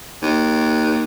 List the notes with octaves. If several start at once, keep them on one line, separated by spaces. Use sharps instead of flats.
D#2